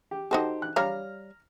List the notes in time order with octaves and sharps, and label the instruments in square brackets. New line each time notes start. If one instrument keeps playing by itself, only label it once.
[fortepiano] G4
[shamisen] D#4 F#4 A4 [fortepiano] G4 C5
[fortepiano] F#6
[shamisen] G3 C#5 F5 [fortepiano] A#5 F6